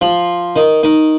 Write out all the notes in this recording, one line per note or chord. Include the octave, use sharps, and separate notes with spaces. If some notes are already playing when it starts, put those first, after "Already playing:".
F3 F4
D#3 D#4
D#3 D#4